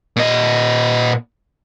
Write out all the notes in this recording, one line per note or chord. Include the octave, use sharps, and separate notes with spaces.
A#2 D#5